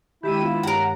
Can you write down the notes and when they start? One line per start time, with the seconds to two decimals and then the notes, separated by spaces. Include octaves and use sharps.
0.23 D#3 G#3 D4 E4 G4 E6 D#7
0.42 B3 F4 F5 E6
0.63 G2 G4 A#4 C#5 F#5 A#5